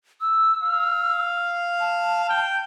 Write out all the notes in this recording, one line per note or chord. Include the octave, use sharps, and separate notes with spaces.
E6
F5
A5
G5